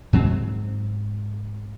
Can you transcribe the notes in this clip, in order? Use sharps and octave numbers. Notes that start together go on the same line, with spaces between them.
G#2 F#3 C4